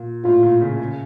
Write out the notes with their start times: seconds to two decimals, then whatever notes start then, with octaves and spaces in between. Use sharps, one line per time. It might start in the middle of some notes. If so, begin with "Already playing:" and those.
Already playing: A#2
0.24 A2 F4
0.43 A#2
0.61 C#3
0.79 C#3